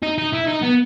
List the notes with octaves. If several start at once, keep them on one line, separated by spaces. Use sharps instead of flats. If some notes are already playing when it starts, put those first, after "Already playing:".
D#4
D#4
E4
D#4
B3